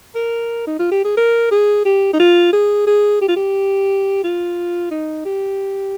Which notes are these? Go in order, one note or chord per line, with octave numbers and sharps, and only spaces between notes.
A#4
D#4
F4
G4
G#4
A#4
G#4
G4
D#4
F4
G#4
G#4
G4
F4
G4
F4
D#4
G4